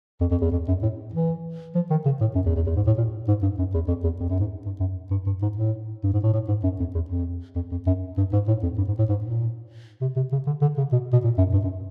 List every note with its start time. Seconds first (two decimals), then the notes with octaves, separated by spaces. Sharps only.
0.21 F2
0.31 F2
0.41 E2
0.52 F2
0.68 F#2
0.83 A2
1.14 E3
1.75 F3
1.90 D#3
2.05 C#3
2.21 A2
2.35 F#2
2.46 E2
2.56 E2
2.66 E2
2.76 G#2
2.86 A2
2.97 A#2
3.28 G#2
3.42 G2
3.58 F#2
3.74 E2
3.88 F2
4.04 E2
4.20 F2
4.30 F#2
4.39 G#2
4.66 G2
4.80 F#2
5.11 G2
5.26 G2
5.42 G#2
5.57 A2
6.04 G2
6.13 G#2
6.23 A2
6.33 A2
6.48 G#2
6.64 F#2
6.80 F2
6.94 E2
7.10 F2
7.55 F2
7.71 F2
7.87 F#2
8.17 G2
8.32 G#2
8.48 A2
8.63 F2
8.78 G2
8.88 G#2
8.98 A2
9.09 G#2
9.24 A#2
10.01 C3
10.16 C3
10.32 C#3
10.47 D3
10.62 D3
10.77 C#3
10.92 B2
11.13 B2
11.24 A#2
11.38 F#2
11.53 G2
11.63 F#2